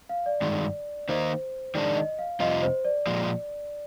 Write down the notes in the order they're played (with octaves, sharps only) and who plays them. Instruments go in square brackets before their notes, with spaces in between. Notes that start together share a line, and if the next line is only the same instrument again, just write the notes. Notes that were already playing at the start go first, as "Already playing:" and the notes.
[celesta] F5
D5
[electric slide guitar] G2 D#3 G#3
[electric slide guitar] D#3 A#3 D#4 [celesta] C5
[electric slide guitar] D#3 G#3 D4 [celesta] D5
[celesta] D#5
F5
[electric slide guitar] F2 C3 G3 C4 F4 [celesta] D#5
[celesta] C5
D5
[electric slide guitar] A#2 F3 G#3